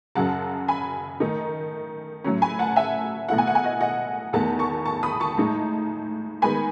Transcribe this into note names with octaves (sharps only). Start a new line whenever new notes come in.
F#2 C#3 F#3 F#5 A5
G#5 B5
D#3 A3 D#4
A2 F#3 C#4
G#5 B5
F#5 A5
E5 G#5
B2 A3 E4 F#5
G#5
F#5
G#5
D#5 F#5
D#5 F#5
E2 D#3 A3 F#5 A5
A5 C#6
A5 C#6
B5 D#6
A5 C#6
A2 G#3 D#4
D#3 G#3 B3 G#5 B5